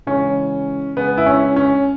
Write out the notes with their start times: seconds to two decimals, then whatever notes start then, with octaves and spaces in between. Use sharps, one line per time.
0.07 C#3 E3 G#3 C#4
0.96 C#3 G#3 B3
1.18 E4
1.26 C#4
1.56 C#4